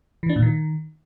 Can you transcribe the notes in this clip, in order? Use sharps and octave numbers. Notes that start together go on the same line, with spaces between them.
E3
D4
A#2
D#3